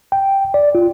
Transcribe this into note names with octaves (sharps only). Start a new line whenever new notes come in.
G5
D5
F4